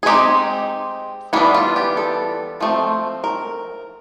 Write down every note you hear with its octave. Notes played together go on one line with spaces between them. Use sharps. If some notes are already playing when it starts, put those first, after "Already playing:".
G#4
G#3 C4 D#4 G4
E3 G3 B3 D4 F#4
F4
G4
A4
F3 A3 C4
A#4